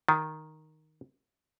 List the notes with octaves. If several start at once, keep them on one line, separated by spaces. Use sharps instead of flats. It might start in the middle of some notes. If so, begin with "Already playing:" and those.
D#3